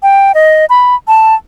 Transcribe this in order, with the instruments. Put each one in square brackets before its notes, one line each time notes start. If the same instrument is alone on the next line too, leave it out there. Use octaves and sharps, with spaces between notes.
[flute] G5
D#5
B5
A5